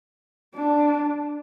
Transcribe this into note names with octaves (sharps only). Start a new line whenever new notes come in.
D4